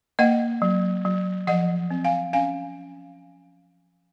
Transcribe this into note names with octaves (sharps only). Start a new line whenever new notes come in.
A#3 D#5 F#5
F#3
F#3
F3 D#5 F#5
C4
F5 G#5
C#4 F5 G#5